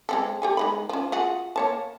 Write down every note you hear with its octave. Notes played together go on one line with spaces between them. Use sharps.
G#3 C4 A4
G4 A4 G#5
G#3 D#4 B5
F3 C#4
F4 F#4 G#4
A#3 C#5 A5